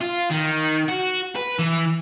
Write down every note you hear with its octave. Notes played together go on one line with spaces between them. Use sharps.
F4
D#3
F#4
B4
E3